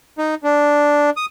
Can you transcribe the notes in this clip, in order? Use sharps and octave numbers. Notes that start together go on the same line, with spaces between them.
D#4
D4
D#6